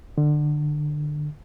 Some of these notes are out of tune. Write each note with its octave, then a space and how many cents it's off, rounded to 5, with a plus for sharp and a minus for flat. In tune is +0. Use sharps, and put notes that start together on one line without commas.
D3 +25